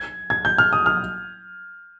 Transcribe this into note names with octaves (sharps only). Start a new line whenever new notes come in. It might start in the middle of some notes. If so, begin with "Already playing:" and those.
Already playing: G#6
G#6
G6
F6
D#6
F6